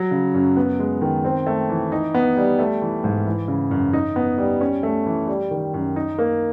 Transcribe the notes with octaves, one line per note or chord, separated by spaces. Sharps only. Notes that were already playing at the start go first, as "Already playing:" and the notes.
Already playing: F#3
C#3
F#2
B3
G#3
D#3
C4
A3
E3
D#4
B3
G3
A3
E3
G#2
E3
C#3
F#2
D#4
B3
G3
C#4
A3
E3
G3
D#3
F#2
D#4
A#3